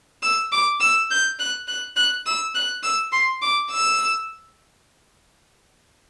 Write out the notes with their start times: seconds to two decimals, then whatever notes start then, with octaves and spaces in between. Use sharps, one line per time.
0.23 E6
0.52 D6
0.80 E6
1.11 G6
1.39 F#6
1.68 F#6
1.96 F#6
2.26 E6
2.55 F#6
2.83 E6
3.12 C6
3.42 D6
3.71 E6